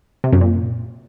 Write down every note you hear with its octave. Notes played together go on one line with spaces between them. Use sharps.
C3
F#2
A#2